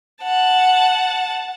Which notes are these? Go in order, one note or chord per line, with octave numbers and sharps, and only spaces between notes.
F#5 A5